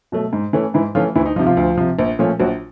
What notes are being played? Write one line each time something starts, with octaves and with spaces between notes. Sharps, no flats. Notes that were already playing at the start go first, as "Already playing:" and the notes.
B2 F#3 A3
G#2
E3 A3 C#4
G#2 E3 E4
E3 F3 A3 C#4 F4
D2 E3 E4
D#4
F3 D#4
C3
F3 F4
D2
C3 F3
A#1
A#2 F3 A3 C#4
A#1 F#3 F#4